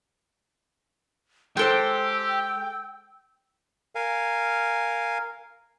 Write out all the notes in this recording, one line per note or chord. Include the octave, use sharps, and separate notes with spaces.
G#3 G4 A4 C5 G5 E6
A#4 F5 G#5